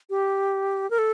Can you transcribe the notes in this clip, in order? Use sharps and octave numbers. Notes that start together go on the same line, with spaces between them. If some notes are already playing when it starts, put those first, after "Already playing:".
G4
A#4
A4